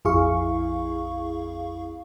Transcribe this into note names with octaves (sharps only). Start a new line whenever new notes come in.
A#1 F2 E4 G#4 F5 C#6